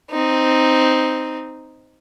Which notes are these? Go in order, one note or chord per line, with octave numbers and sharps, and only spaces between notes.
C4 D#4